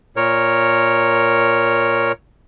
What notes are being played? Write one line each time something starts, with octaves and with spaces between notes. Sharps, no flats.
A#2 A#4 C#5